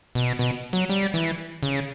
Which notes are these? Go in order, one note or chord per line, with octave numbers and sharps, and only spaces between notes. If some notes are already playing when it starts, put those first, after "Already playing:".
B2
B2
F#3
G3
E3
C#3